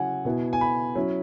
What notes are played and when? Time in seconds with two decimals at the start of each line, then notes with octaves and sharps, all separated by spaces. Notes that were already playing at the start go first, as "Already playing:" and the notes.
Already playing: C#3 F#3 C#4 E4 F#5 G#5
0.25 B2 B3 E4
0.53 G#5
0.61 B5
0.95 F#3 C#4 E4